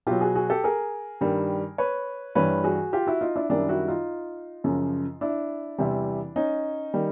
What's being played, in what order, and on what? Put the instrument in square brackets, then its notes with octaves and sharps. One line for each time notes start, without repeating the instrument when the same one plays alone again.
[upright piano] B2 F#3 F4 G4
F#4 G#4
F#4 G#4
G4 A4
G#4 A#4
G2 D#3 G3
B4 C#5
G2 E3 G3 B4 C#5
F#4 G#4
F4 G4
E4 F#4
D#4 F4
D4 E4
F#2 D#3 G3 D4 E4
E4 F#4
D#4 F4
F#2 C#3 F3
D4 E4
E2 C3 E3 G3
C#4 D#4
D#3 G3